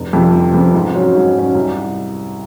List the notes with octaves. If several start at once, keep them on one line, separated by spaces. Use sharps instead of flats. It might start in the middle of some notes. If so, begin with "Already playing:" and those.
Already playing: F1
F2 C3 F3
F1
F2 C3 F3
G#2
F#3 C#4
G#2
F#3 C#4
C2